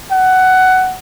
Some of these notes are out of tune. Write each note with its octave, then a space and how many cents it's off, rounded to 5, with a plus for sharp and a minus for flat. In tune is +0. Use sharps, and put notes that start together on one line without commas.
F#5 +15